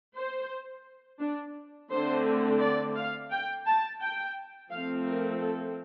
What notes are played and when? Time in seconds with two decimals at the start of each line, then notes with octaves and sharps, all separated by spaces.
0.16 C5
1.20 D4
1.91 D3 A3 C4 C5
2.61 D5
2.96 F5
3.31 G5
3.67 A5
4.01 G5
4.71 F3 A3 C4 F5
5.07 A#4
5.41 A4